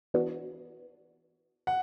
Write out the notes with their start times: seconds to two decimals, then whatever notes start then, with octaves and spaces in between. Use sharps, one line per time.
0.14 E3 B3 D4 F#4
1.67 F#5